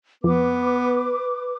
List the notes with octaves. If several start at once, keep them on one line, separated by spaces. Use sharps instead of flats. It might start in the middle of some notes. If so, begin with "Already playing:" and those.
F2 B3 B4 D6